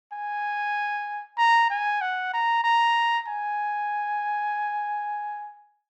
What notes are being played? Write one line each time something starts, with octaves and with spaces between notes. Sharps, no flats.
G#5
A#5
G#5
F#5
A#5
A#5
G#5